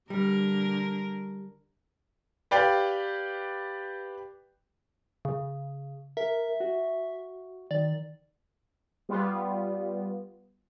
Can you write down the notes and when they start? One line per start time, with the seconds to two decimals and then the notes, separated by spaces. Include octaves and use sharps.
0.10 D3 G3 A#4
2.51 G4 B4 D5 F5 G5
5.25 C#3
6.17 A#4 E5
6.60 F#4
7.71 D#3 D5
9.09 G3 B3 F4